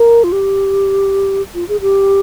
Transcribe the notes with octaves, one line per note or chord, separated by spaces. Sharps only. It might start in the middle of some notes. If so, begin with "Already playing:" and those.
Already playing: A#4
F4
G4
F4
G#4
G4